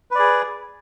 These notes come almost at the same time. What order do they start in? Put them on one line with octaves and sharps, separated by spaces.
B4 D5 G#4